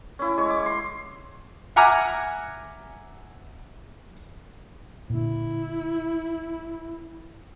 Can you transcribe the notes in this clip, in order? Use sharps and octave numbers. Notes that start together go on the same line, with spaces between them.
C#4 E4
G#3 C#5
D6
C6
E5 F#5 G#5 A#5 D6 F6
A#2 D3 E4